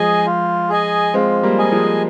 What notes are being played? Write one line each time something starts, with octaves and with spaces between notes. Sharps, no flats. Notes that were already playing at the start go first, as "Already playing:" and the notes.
Already playing: F3 G#3 G#4 D#5 G#5
F4
G#4 D#5 G#5
G#3 C4 F4
G3 A#3
G#4 D#5 G#5
F3 G#3